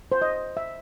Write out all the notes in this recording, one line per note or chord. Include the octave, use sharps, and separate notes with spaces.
C5
D#5
E5